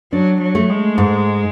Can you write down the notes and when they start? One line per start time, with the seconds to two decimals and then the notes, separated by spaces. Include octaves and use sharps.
0.13 F#3 D4
0.41 F#3
0.55 A3
0.69 G#3
0.98 G#2